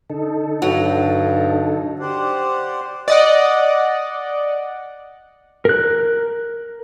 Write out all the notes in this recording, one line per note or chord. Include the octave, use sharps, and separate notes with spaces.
D3 D#4 A4
G2 F#3
G4 C5 D5 F#5
D5 D#5 F#5
A#4 F#6